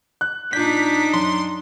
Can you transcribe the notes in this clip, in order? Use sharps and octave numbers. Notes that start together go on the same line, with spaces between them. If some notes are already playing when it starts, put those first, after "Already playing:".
F#6
A#2 D4 D#4 G6 B6
F#2 C6